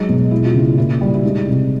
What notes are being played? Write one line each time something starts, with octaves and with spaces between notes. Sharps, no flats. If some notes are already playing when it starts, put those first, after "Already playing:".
Already playing: F#3 G#3 D#4
B2
G#3 E4
F4
C#3
E4
A#2 E4
G3
E4
G#3 D#4
C3